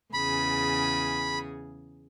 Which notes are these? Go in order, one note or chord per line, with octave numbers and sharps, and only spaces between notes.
E2 C#3 G#4 B5